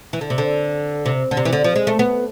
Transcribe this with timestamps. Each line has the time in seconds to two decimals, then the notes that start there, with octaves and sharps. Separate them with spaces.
0.13 E3
0.21 D3
0.30 C3
0.38 D3
1.06 C3
1.31 D3
1.37 C3
1.45 E3
1.53 D3
1.64 F3
1.76 G#3
1.87 A3
1.99 B3